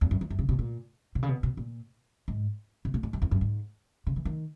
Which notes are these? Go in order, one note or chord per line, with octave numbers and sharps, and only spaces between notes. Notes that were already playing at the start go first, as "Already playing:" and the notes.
E2
F#2
E2
F#2
C#3
B2
A#2
B2
C#3
B2
B2
A#2
G#2
B2
A#2
G#2
F#2
E2
F#2
G#2
C#3
E3
D#3